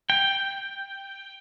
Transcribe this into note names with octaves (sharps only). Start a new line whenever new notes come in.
G5